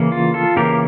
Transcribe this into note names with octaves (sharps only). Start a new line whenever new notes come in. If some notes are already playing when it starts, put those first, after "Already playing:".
Already playing: C#3 E3 A#3
F4
F4 A4
C#3 E3 A#3 G4 A#4